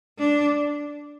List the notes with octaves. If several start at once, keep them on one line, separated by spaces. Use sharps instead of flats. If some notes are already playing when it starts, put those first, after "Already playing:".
D4